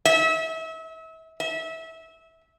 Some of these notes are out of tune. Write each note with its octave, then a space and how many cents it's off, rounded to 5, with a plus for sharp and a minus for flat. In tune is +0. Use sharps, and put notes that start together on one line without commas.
E5 -35
E5 -20